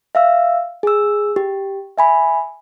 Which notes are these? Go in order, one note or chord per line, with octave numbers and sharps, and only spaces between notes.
E5 F5 E6
G#4 E6
G4
E5 G#5 B5